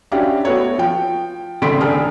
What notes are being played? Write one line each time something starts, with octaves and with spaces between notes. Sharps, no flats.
C#4 D4 E4 F#4 G4 F5
A3 B3 F#4 A4 C#5
F3 G5
G#1 A2 C#3 C6 B6 D7
C2 A2 D4 G#4 A4 F6